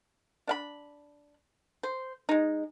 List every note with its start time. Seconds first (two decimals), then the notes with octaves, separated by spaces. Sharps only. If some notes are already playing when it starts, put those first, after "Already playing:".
0.47 D4 F5 B5
1.83 C5
2.29 G#3 D#4